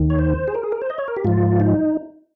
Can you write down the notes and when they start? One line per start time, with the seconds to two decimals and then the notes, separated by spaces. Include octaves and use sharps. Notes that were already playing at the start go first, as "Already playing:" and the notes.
Already playing: D#2 D#3
0.10 C#5
0.19 C5
0.48 G#4
0.54 A#4
0.63 G#4
0.72 A#4
0.82 C5
0.90 D#5
0.98 C#5
1.08 A#4
1.16 G4
1.25 G#2 F3 F4
1.60 D#4